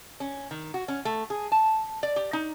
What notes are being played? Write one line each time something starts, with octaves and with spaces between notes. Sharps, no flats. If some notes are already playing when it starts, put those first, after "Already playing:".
C#4
D#3
F#4
C#4
A3
G#4
A5
D5
G4
D#4